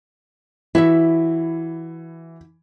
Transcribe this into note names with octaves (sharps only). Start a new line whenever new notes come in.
E3 E4 F#4 E5